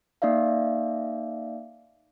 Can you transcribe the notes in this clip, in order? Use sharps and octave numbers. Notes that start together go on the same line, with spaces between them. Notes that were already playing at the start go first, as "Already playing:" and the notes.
A#3 D#4 D5 E5 F5